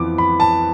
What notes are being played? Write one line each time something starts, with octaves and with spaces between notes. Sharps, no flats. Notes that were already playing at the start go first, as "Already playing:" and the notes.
Already playing: F2 E3 B3 D6
B5
A5